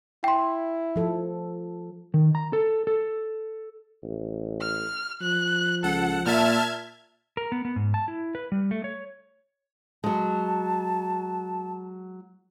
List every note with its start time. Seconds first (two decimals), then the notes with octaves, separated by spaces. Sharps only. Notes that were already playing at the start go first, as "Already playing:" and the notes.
0.24 E4 G5 C6
0.96 F3 A4
2.14 D#3
2.35 A#5
2.53 A4
2.87 A4
4.03 A1
4.61 F6
5.21 F3 F#6
5.84 C#2 A4 F#5
6.26 A#2 E5 A5 F6 G#6
7.37 A#4
7.52 B3
7.65 B3
7.76 G#2
7.94 A5
8.08 E4
8.35 B4
8.52 G3
8.71 A3
8.84 C#5
10.04 F#3 G#3 A5